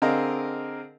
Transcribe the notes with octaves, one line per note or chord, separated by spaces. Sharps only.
D3 C4 G#4 A#4 D#5 F5